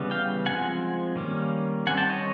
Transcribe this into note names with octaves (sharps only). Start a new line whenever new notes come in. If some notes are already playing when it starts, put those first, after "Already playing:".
Already playing: C#3 E3 G3 B3
F5 G5
F3 G#3 C4 F#5 G#5
D#3 G3 A#3 C#4
D#3 G3 C4 F#5 G#5
G5 A5
C#5 D#5